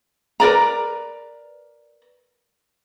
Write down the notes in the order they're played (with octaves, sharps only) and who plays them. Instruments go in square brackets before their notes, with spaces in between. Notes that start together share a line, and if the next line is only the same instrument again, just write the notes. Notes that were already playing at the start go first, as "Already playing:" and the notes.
[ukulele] A#4 B4 D5 A#5